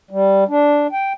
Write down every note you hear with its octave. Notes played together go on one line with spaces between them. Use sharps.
G3
D4
G5